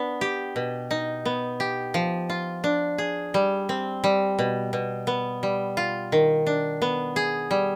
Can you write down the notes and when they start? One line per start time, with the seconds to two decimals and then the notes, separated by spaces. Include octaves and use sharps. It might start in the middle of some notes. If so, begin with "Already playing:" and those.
Already playing: B3 D4
0.21 G4
0.56 B2
0.91 D#4
1.25 B3
1.60 G4
1.94 F3
2.29 F4
2.64 D4
2.98 G#4
3.34 G3
3.69 C4
4.04 G3
4.39 B2
4.73 B2
5.07 B3
5.43 G3
5.77 F4
6.12 D#3
6.47 D4
6.82 B3
7.16 G#4
7.51 G3